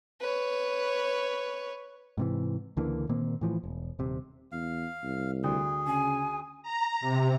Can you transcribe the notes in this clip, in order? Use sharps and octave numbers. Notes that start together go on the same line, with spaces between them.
B4 C#5
G#2 C3 E3
C#2 D3 E3 A#3
A#2 D#3 A#3 C4
A2 E3 F3
E1
D#1 C3
E2 F5
C2
D2 G#4
C#3 G#5
A#5
C3